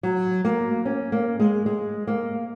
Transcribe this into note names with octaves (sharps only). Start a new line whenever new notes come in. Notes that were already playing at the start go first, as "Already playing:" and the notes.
F#3
A#3
C#4
A#3
G#3
G#3
A#3